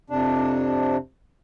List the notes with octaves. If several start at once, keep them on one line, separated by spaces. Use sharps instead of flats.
F2 C3 D4